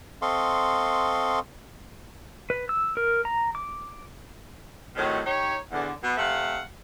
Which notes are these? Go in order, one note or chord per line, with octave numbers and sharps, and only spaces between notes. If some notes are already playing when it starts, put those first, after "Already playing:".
C4 A4 D#5 F5 C6 C#6
B4
E6
A#4
A#5
D6
A2 C3 D#3 F#3
D#4 G4 C#5
E2 D3
B2 B3
C3 A3 F5 F#5